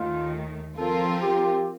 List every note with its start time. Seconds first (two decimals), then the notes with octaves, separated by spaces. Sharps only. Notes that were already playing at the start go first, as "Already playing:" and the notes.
Already playing: D#2 D#3 A3 F4
0.77 F3 C4 F4 A4 A#4
1.22 G4